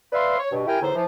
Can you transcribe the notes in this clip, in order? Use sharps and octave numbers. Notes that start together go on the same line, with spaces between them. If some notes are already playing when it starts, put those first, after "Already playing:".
B4 D5 E5 F5 C6
C#5
G2 B2
E4 G4 A#4 G5 G#5
E2 A2 D3 D#4 C5
E3 F3